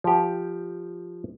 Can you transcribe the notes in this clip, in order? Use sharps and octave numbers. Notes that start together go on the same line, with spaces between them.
F3 G4